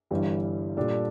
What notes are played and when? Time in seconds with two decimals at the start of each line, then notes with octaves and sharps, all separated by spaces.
0.11 G1 G2 E3 G3
0.77 A#2 G3 D4 A4